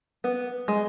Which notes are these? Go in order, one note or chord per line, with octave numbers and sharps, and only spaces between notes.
B3
G#3